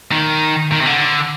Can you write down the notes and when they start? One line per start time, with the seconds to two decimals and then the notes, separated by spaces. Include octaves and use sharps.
0.12 D#3
0.72 D#3
0.80 C3
0.86 D3